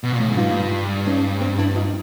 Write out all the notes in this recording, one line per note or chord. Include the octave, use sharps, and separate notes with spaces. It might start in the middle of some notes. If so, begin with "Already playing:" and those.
B2
A#2
A2
G#2 E4
G2 D#4 F4
C#4 D#4
C4 D4
D4 E4
D#4 F4